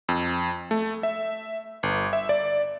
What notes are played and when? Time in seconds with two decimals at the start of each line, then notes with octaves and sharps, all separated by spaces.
0.09 F2
0.71 A3
1.03 E5
1.83 G1
2.13 E5
2.29 D5